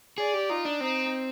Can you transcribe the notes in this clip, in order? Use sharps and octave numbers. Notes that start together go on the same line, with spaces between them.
G#4 D5
G4
D#4 F4
D4
C4 D#4